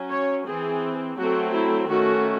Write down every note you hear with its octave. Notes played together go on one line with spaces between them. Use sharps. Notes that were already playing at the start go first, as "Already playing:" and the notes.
Already playing: F#3 C#4
C#5
E3 C4 G#4
F#3 A3 C4 F#4
E4
D#3 A3 C#4 F#4